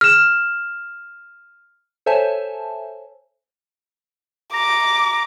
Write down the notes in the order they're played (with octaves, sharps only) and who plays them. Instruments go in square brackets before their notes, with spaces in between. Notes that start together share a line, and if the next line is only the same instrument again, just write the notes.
[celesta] F6 E7
[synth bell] A4 C5 C#5 E5 G#5 A5
[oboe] A#5 [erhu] D6